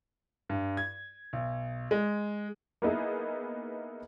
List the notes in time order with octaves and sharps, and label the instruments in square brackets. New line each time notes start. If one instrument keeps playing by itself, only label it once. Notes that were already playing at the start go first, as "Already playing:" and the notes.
[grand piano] G2
G#6
B1
G#3
[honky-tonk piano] A#3 B3 D#4 E4 G#4